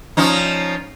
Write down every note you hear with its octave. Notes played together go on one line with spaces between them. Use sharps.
F3 C#4 D#4